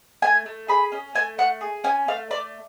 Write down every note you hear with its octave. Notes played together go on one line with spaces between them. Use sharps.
A3 G#5
A3
G#4 B5
C#4
A3 G#5
A3 F#5
G#4
C#4 G#5
A3 F5
A3 D5